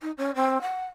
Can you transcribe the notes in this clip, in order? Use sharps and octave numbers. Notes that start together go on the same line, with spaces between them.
D#4
C#4
C4
F#5